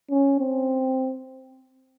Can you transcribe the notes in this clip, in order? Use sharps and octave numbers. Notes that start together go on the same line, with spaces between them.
C#4
C4